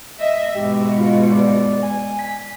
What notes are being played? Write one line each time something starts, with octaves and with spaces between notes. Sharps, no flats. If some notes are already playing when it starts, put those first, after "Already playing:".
D#5 E5
G#2 B2 G4
F4
D5
G#5
B6